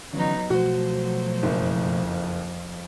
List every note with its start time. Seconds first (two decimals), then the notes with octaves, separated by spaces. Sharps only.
0.13 D3 E3 F#3 B3 C#4 D#4
0.50 B2 F3 F#3 A3 F#4 C5
1.43 F#1 F2